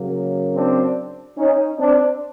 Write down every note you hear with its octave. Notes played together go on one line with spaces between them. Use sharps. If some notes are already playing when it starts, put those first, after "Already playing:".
Already playing: C#3 F#3 A#3
C4 D4
C#4 D#4
C4 D4